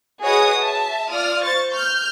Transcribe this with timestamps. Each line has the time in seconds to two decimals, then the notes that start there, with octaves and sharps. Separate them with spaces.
0.22 F#4 G#4 B4 C#5 D#5 D#6
0.59 E5 A5
1.09 F4 D5 D#6 F6
1.44 C5 C#6 A6
1.74 F6 G6